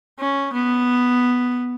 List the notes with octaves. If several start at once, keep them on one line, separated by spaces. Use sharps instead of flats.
C#4
B3